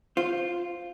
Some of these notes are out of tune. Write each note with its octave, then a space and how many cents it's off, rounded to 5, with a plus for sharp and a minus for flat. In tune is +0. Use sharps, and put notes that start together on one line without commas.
F4 +0 C5 +0